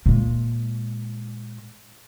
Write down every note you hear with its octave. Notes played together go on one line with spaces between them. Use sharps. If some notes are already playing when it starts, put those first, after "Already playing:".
A#2 G#3